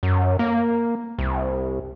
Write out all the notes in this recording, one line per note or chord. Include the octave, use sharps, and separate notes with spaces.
F#2
A#3
C2